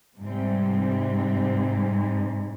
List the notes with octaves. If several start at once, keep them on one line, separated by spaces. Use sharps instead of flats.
G#2 C3 G3 C4